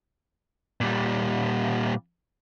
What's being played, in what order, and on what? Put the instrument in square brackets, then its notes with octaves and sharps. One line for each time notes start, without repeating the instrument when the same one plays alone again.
[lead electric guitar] A#2 G3